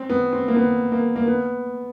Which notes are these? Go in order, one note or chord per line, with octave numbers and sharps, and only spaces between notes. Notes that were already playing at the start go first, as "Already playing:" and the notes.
Already playing: C4
B3
C4
A#3
B3
A#3
A#3
B3